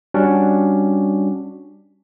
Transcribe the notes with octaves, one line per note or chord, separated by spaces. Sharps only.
G3 C#4 D4 F#4